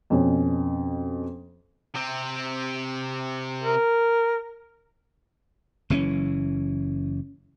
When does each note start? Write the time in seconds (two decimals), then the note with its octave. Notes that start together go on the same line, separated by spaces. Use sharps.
0.10 F2 B2 C#4
1.95 C3 C4
3.63 A#4
5.90 F#1 E3 C4 C#4